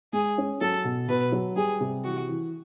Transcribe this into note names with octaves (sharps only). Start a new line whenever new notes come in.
G#3 G#4
C#4
F#3 A4
B2
B2 B4
F#3
G3 G#4
C3
E3 F#4
E3